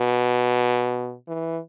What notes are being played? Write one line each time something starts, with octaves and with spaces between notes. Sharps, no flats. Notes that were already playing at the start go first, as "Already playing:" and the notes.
Already playing: B2
E3